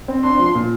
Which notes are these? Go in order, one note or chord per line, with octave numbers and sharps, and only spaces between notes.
C4
D4 C6
F3
A#2